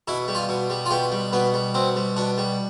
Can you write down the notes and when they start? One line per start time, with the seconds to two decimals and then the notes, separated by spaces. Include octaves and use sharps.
0.08 B2 E4
0.28 G3
0.35 F4
0.49 B2
0.70 G3
0.86 F4
0.91 B2 G4
1.12 G3
1.33 B2 B3
1.54 G3
1.74 B2 C4
1.96 G3
2.17 B2 D4
2.38 G3